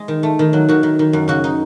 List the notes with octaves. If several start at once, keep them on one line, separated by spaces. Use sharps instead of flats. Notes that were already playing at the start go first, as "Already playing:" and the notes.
Already playing: G#3 G#4
D#3
A3
D#3
F#3
D#3 F#4
D#3
D#3
F#2
C#3 F#4
D#4